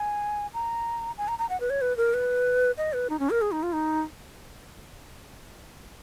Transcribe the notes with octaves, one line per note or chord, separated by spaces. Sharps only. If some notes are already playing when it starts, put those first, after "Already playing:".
Already playing: G#5
A#5
G#5
A#5
A#5
F#5
B4
C#5
B4
A#4
B4
D#5
B4
D#4
C#4
A#4
G#4
D#4
F4
D#4